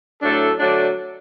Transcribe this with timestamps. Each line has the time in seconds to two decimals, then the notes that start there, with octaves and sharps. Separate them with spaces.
0.22 A2 F#3 A3 D4 A4
0.60 D3 F#3 A3 D4